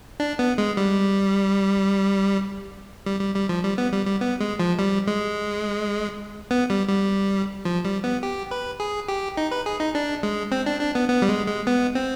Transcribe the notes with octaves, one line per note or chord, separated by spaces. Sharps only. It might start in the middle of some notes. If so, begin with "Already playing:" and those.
D4
B3
G#3
G3
G3
G3
G3
F3
G3
B3
G3
G3
B3
G#3
F3
G3
G#3
B3
G3
G3
F3
G3
B3
G4
B4
G#4
G4
D#4
B4
G#4
D#4
D4
G#3
C4
D4
D4
B3
B3
G3
G#3
G#3
B3
C4